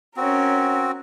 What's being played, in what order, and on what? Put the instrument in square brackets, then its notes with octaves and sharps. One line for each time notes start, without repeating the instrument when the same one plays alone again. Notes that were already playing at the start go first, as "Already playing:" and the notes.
[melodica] C4 F#4 [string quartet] C#4 A#4